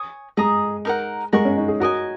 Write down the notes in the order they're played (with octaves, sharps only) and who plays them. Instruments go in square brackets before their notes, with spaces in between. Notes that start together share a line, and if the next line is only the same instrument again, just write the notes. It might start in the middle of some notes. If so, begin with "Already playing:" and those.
Already playing: [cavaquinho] C#5 G#5 D#6
[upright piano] G#3 [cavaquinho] G#4 D#5 A#5 D#6
[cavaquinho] D#4 A#4 F#5
[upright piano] G#3 [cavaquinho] A#4 F#5 C#6
[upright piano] C#4
D#4
G#4
[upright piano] F#4 [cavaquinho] A#4 D#5 G#5